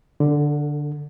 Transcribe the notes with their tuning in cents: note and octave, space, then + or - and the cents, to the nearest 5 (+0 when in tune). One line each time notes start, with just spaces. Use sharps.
D3 +0 A4 +35